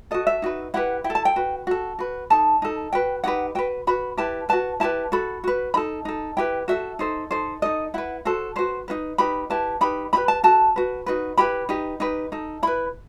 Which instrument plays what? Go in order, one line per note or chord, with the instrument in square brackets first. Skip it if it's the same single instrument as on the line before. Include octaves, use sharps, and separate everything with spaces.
[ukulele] F#4 A4 D#5
E5
D#4 F#4 B4
E4 G4 B4 F#5
E4 G5
A4
A5
G5
F#4 B4
F#4 A4
F#4 B4
D#4 A4 A5
D#4 A4
F#4 B4 G5
D#4 G4 B4 F#5
F#4 B4 G5
F#4 B4 B5
E4 G4 B4 A5
F#4 B4 A5
E4 G4 B4 A5
F#4 A4 B5
F#4 B4
D#4 A4 B5
D#4 A4
E4 G4 B4 G5
F#4 A4 E5
D#4 A4 C5
D#4 A4 C5
D#4 A4 D#5
E4 B4 F#5
F#4 A4 C5
F#4 B4 C5
D#4 F#4 B4
D#4 G4 B4 B5
E4 G4 B4 A5
D#4 G4 B4 B5
D#4 G4 B4 B5
A5
F#4 A4 A5
F#4 B4
D#4 F#4 B4
E4 G4 B4 B5
D#4 G4 B4
D#4 G4 B4
D#4 A4
E4 B4 B5